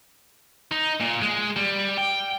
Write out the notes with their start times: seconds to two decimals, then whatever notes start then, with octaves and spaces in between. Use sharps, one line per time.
0.72 D#4
1.00 A#2
1.22 G#3
1.56 G3
1.98 G5